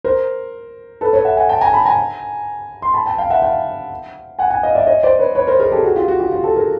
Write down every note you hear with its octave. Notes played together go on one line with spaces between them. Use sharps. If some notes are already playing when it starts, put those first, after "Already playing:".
A#4 C5
A4 B4
B4 C#5
E5 F#5
F#5 G#5
G5 A5
G#5 A#5
A5 B5
G#5 A#5
C6
A5 B5
G5 A5
F5 G5
E5 F#5
F5 G5
F#5 G#5
F#5 G#5
D#5 F5
D5 E5
C#5 D#5
C5 D5
B4 C#5
B4 C#5
A#4 C5
G#4 A#4
G4 A4
F#4 G#4
F4 G4
F#4
F4 G4
F4 G4
G4 A4
G#4 A#4